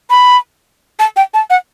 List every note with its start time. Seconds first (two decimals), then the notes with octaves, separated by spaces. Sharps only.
0.10 B5
0.99 A5
1.17 G5
1.34 A5
1.50 F#5